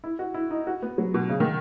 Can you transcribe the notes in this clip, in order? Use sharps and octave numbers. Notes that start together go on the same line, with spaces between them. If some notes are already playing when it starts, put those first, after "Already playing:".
E4
F#4
E4
D#4
F#4
B3
F#3
B2
C#3
D#3